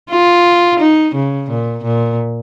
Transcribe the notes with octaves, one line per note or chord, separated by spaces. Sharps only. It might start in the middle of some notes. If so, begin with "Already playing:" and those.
F4
D#4
C#3
A#2
A#2